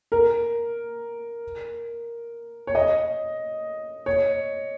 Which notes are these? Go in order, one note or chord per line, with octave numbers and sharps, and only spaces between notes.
A#4
C#5
D#5
C#5